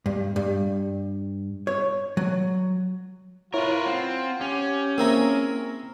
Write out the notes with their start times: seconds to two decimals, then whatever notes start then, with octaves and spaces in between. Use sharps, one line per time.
0.06 G2
0.36 G2
1.67 C#5
2.17 F#3
3.54 E4 F4 A#4 B4 C#5
3.86 C4 F#5
4.41 C#4 G4
4.98 A#3 C4 E4 G#4 A#4 A#5